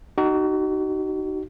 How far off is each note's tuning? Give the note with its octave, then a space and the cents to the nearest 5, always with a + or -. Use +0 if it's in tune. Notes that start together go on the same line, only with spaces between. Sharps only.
D#4 -15 F#4 +35